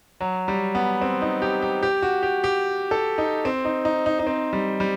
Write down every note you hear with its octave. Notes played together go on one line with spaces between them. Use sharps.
F#3
G3
B3
C4
D#4
G4
G4
G4
F#4
G4
G4
A4
D#4
C4
D#4
D#4
D#4
D#4
C4
G3
G3